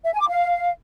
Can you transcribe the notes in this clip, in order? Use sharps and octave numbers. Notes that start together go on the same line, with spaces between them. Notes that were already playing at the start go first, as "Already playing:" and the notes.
E5
G#5
D6
F5